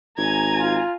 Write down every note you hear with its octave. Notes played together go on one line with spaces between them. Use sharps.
G#1 G#5 A#5 G#6
F4